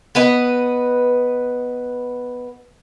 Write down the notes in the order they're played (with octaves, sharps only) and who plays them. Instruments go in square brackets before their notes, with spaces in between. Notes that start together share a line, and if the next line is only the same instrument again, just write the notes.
[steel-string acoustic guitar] B3 B4 D#5